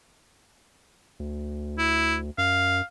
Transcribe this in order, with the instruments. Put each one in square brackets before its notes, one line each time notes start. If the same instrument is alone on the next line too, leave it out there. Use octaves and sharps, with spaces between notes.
[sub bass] D2
[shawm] E4
[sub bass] F#2 [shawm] F5